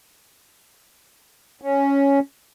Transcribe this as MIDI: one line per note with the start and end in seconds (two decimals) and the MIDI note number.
1.62 2.19 61